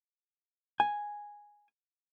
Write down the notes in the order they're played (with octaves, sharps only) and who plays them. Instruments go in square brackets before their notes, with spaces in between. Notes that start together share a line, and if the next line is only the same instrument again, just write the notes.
[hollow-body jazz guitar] G#5